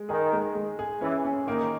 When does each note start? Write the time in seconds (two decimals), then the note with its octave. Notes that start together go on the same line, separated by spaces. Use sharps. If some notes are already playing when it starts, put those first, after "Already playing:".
Already playing: G#3
0.09 D#3 G#4
0.33 G#3
0.55 G#3
0.79 G#4
1.01 E3 C#4
1.25 C#4
1.47 D#3 A#3